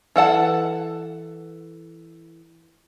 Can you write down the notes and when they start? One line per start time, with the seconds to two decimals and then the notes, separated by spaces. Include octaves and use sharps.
0.16 E3 A4 F#5 A5